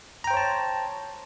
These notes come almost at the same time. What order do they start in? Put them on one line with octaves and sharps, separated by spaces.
A#5 G5 C5 C#5 A5